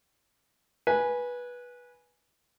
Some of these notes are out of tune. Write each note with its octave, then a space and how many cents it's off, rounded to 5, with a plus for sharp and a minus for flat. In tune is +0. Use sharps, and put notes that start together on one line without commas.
B4 -15 G#5 +0